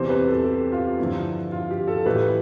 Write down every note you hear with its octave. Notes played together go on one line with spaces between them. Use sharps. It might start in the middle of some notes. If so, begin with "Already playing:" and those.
Already playing: E2 C3 E3 G3 C5
B4
A4
G4
F4
G2 D3 F3 E4
F4
G4
A4
A2 E3 G3 B4